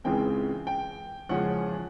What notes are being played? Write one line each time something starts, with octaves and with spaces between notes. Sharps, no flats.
C#2 C#3 E3 G#3 C4 G5
G5
E2 C#3 F3 G#3 C#4 F#5